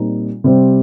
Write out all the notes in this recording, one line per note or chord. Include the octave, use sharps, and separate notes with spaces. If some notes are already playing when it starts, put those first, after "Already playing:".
Already playing: A#2 G3 C4 D#4
C3 G3 C4